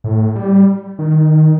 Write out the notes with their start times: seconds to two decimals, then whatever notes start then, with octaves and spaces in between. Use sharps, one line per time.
0.04 A2
0.36 G3
0.99 D#3